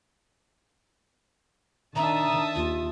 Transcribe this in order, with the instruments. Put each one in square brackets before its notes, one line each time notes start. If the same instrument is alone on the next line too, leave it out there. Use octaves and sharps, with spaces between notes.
[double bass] D#3 D4 [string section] E5 A5 D#6 [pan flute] A#5
[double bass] D#2 [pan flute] F4